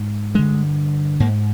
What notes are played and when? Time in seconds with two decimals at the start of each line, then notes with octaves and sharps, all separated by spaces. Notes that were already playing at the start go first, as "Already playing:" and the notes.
Already playing: G#2
0.34 G2 D3 G#3
1.20 G#2 A#3